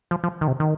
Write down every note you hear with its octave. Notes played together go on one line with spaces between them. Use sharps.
F3
F3
D#3
C3
D#3